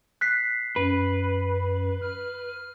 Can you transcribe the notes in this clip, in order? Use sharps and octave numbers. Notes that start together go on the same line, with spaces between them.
F#6 B6 C7
F#2 B4
F6